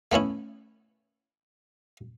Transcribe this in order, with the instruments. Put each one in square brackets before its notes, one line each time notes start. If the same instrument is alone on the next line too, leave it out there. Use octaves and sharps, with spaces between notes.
[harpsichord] A3 B3 C#4 E4